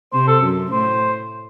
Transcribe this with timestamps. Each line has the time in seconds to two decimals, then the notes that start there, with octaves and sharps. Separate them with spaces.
0.13 C3 C5
0.27 A4
0.42 F#2
0.71 A2 C5